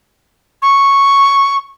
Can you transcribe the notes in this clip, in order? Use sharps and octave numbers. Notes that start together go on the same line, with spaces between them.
C#6